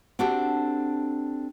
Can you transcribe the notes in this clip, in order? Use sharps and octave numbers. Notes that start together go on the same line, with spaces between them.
C4 D4 F#4 G4 A4